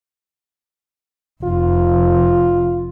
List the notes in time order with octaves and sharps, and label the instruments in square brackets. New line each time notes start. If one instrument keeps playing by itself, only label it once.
[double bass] F1 [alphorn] F4